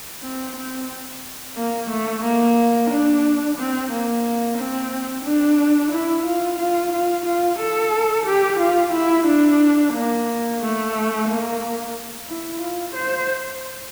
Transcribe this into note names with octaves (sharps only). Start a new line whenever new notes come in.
C4
C4
A#3
A3
A#3
D4
C4
A#3
C4
D4
E4
F4
F4
F4
F4
A4
G4
F4
E4
D4
A#3
A3
A#3
E4
F4
C5